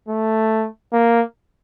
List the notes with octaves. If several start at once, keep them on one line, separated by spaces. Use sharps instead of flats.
A3
A#3